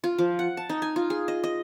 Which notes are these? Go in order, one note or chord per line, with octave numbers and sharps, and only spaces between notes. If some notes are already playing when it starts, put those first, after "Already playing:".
F4
F3
F#5
A5
D#4
G#5
F4
G#4
D#5
D#5